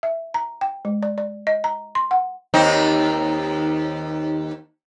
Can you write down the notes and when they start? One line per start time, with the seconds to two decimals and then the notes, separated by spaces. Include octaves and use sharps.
0.03 E5
0.34 A#5
0.61 G5
0.85 G#3
1.03 D5
1.18 D5
1.47 D#5
1.64 A#5
1.95 C6
2.11 F#5
2.54 D#2 C4 D#4